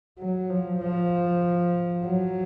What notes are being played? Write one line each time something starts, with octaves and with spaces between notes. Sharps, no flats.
F#3
F3
F3
F#3